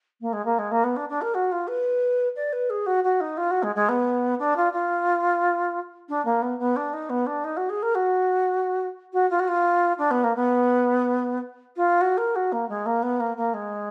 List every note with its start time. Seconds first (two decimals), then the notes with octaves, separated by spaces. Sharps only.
0.21 A#3
0.32 G#3
0.45 A#3
0.58 G#3
0.71 A#3
0.83 B3
0.96 D4
1.09 D4
1.21 A#4
1.34 F#4
1.51 F4
1.67 B4
2.35 D5
2.52 B4
2.70 G#4
2.86 F#4
3.03 F#4
3.20 D#4
3.37 F4
3.50 F#4
3.62 G#3
3.75 G#3
3.88 B3
4.39 D4
4.56 F4
4.72 F4
6.08 D4
6.25 A#3
6.42 B3
6.59 B3
6.76 D4
6.93 D#4
7.09 B3
7.26 D4
7.44 D#4
7.56 F#4
7.69 G#4
7.82 A#4
7.94 F#4
9.12 F#4
9.30 F4
9.39 F#4
9.47 F4
9.98 D4
10.10 B3
10.23 A#3
10.36 B3
11.76 F4
12.00 F#4
12.17 A#4
12.35 F#4
12.52 A#3
12.69 G#3
12.86 A#3
13.02 B3
13.20 A#3
13.36 A#3
13.53 G#3